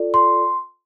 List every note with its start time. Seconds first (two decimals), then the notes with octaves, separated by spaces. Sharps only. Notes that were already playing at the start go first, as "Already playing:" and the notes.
Already playing: F4 A4 D5
0.14 C6